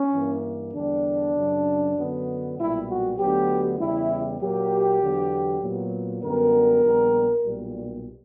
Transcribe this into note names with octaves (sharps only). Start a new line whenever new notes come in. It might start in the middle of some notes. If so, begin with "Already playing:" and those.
Already playing: C#4
G2 E3 A#3
E2 D3 G3 D4
F#2 C#3 F#3
F#2 D3 F#3 B3
B1 A#2 G3 E4
F#4
D2 D3 F#3 B3 G4
E2 C#3 G3 E4
A#2 F#3 A#3 G4
E2 D3 F#3 B3
A#2 F#3 B3
F#2 D3 G3 B3 A#4
A#1 A#2 G3 B3
B1 A#2 G3